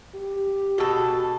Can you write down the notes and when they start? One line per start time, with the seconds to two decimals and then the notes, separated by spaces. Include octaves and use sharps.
0.15 G4
0.78 B2 F#4 G#4 A4